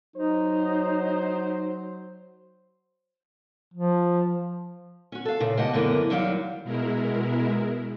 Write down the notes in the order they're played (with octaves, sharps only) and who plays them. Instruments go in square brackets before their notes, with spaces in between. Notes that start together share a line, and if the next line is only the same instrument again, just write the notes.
[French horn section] F#3 C5 [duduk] D#4
[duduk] F3
[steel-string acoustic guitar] C#4 F#4
A4 F5
A#2 C#3
E2 C#3 G4 D#5 F#5 A5
F#2 D3 E3 A#3 B3
D#2 F#3 G3 G4 C5 F5
[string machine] B2 G#3 E4 A#4